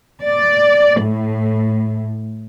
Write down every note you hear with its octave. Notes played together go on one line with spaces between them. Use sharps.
D5
A2